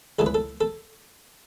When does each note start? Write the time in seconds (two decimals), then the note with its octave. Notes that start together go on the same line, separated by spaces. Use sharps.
0.19 C#2 C#3 E3 A4
0.26 B4
0.34 A4
0.61 A4